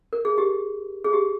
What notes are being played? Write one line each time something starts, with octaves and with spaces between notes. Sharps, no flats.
A#4
G#4
G4
G#4
G4